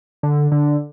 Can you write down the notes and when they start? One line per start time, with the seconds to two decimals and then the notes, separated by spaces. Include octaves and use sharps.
0.23 D3
0.52 D3